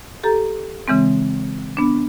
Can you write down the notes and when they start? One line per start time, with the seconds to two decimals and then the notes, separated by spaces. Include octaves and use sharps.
0.24 G4 A4 A#5
0.88 C#3 E3 G#3 C4
1.77 B3 D4